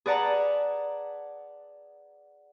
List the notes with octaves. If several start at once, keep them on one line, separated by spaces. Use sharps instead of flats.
G#4 B4 D5 F#5 A5 A#5